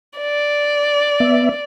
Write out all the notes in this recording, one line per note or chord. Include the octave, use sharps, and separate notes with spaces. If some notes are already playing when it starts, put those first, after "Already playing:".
D5
B3 E5